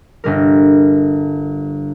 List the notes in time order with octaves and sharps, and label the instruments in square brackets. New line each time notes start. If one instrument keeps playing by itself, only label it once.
[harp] G1 G3 A#4